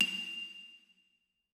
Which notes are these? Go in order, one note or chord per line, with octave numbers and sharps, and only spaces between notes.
F7